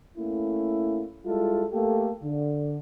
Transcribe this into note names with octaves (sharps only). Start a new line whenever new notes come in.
A3 A#3 C#4 E4
G3 G#3 E4 F4 A4
A3 A#3 G4 A4
D3